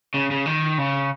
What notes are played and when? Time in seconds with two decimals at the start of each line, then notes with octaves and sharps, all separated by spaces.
0.14 C#3
0.31 C#3
0.46 D#3
0.78 C#3